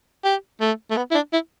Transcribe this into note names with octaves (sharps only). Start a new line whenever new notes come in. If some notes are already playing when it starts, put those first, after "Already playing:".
G4
A3
A3
B3
E4
D4
E4